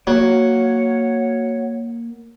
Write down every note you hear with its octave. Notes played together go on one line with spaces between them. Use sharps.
F#3 A#3 C#5 F#5